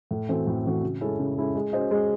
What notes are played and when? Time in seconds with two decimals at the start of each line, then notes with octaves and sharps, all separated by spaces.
0.11 A2
0.29 E3 A3 C4 F#4
0.47 A2
0.65 E3 A3 C4 F#4
0.83 C#3
1.01 G#3 C#4 E4 A4
1.19 C#3
1.37 G#3 C#4 E4 A4
1.55 G#3
1.73 C#4 F#4 C5 D#5
1.91 G#3